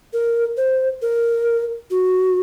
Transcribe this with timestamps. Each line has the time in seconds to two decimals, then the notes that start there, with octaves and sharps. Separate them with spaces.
0.13 A#4
0.57 C5
1.02 A#4
1.91 F#4